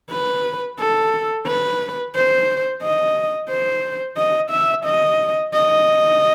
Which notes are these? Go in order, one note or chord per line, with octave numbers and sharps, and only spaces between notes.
B4
A4
B4
C5
D#5
C5
D#5
E5
D#5
D#5